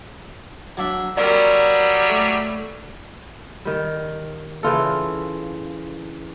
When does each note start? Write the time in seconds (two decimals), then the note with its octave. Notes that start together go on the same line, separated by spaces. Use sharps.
0.77 F#3 D4 E5
1.17 F#3 G3 A#3 C4 F#4 A#4 D5
2.09 A3
3.65 D#3 G3
4.63 C#3 E3 F4 A4